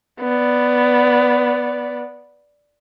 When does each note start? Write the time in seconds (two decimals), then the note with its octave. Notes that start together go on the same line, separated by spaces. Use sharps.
0.21 B3 D5